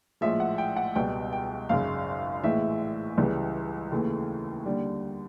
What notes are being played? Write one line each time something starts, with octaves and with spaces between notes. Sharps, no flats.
A#1 A2 F3 G#3 E5
F#5
G5
F#5
C#2 B2 G3 G5
G5
G#1 F#2 C#3 F5
A#1 A2 E3 G#3 E5
C#2 C#3 E3 G3
D#2 C#3 E3 A3
D#2 D3 G3